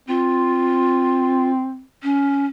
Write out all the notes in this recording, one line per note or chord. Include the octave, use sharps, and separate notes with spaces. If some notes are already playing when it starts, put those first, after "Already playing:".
C4 F4
C#4